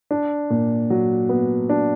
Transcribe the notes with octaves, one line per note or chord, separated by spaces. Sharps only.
D4
A#2
F#3
B3
D4